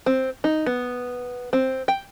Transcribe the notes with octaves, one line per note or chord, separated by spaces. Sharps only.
C4
D#4
B3
C4
G5